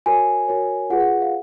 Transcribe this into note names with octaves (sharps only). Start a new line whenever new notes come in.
F#4 A#4 C#5 G#5
F#4 A#4 C#5
F4 G#4 B4 F#5
F#5
F5